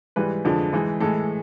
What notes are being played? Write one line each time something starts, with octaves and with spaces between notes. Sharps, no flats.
G#2 E3 G3 B4
F2 D3 F3 G#3
G#2 E3 G#3
A2 E3 G#3 A4